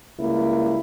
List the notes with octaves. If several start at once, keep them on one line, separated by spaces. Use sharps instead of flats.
C#2 G3 A#3 E4